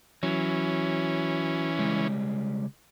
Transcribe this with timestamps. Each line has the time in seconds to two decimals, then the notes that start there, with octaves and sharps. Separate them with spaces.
0.23 E3 F#3 C#4
1.79 C#3 G3 G#3